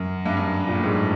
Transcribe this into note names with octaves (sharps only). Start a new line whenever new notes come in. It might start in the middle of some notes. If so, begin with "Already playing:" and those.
Already playing: F#2
G2
F#2
A#2
A2
G#2